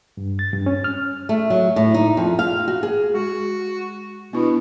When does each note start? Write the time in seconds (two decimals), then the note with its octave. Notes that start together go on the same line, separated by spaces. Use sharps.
0.17 G2
0.39 A6
0.54 G2
0.66 C#4
0.84 F6
1.29 A3
1.50 F#3
1.76 A2
1.94 D#4
2.17 F2
2.39 F5
2.68 F#4
2.83 G#4
3.14 G#3 F#4
4.33 B2 B3 D4 E4